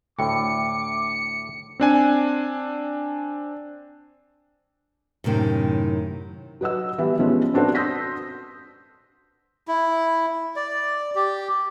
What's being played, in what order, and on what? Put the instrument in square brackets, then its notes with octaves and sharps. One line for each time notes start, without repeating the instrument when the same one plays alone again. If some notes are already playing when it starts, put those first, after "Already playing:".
[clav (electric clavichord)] D2 A2 [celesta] G5 [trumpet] D6 [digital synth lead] C#7
[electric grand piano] C4 D4 G#5
[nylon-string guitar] F#2 A2 C3 D#3
[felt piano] F#3 B4 D#5 F#5 E6
E3 G3 B3
B2 F3 G3 G#3 B3 C#4
C4 D4 F#4 B4 C5
C6 D#6 E6 G6 A#6 B6
[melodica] E4
D5
G4